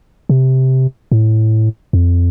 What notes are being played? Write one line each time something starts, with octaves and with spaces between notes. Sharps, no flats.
C3
A2
F2